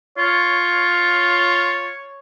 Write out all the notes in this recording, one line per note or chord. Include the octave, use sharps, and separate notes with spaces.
F4 C#5